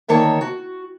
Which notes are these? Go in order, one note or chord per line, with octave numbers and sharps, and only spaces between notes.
D2 D#3 A#3 C#5 A5
F#4